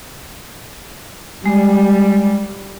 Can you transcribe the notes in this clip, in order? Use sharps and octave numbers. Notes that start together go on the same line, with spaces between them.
G3 G#3